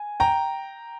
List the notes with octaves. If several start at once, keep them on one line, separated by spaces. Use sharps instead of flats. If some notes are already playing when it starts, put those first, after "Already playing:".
Already playing: G#5
G5 A#5